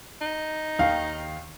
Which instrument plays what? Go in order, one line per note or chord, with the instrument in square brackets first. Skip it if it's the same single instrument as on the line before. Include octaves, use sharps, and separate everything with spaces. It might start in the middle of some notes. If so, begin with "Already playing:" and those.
[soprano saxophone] D#4
[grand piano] D#2 D#3 F5